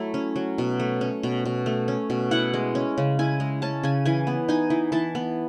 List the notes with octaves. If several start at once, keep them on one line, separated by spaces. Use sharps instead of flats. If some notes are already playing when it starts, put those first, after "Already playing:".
Already playing: F#3 A3 E4
C#4
F#3
B2
A3
C#4
B2
B2
A3
C#4
B2
E4 F#5
G#3
C#4
C#3
E4 G#5
G#3
C#4 A5
C#3 G#5
E3 G#5
B3
D#4 G#5
E3
E3 A5
B3